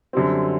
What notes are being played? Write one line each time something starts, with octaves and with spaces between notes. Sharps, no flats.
F#2 D3 G3 C4